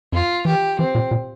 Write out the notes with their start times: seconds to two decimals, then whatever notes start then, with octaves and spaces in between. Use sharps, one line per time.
0.12 F2 F4
0.45 E3 G4
0.79 E3 C4
0.95 A#2
1.11 A#2